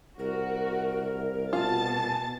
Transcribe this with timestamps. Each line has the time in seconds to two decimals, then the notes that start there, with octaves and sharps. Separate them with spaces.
0.19 C2 F#4 A#4
1.53 B2 F4 G#5 A5 A6